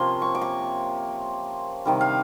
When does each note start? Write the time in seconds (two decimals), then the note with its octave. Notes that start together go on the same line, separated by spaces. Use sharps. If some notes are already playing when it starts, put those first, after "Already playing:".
Already playing: C3 F3 A#3 C#4 C6
0.22 C#6
0.35 D6
0.41 C#6
1.85 C3 D#3 G3
2.01 F5